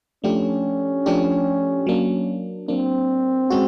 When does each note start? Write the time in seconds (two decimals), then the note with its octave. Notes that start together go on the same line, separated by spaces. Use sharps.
0.24 F3 A3 C#4 D4 G4
1.06 F3 A3 D4 G4
1.87 F#3 A#3 D4
2.68 F#3 A#3 C4 D4
3.50 G#3 C#4 F#4